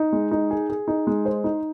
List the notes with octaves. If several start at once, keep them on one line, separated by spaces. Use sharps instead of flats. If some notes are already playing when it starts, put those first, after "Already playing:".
Already playing: D#4
G#3
D#4
G#4
G#4
D#4
G#3
C5
D#4